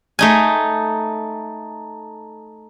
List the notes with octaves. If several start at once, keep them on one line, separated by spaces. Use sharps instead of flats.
A3 D#4 G#5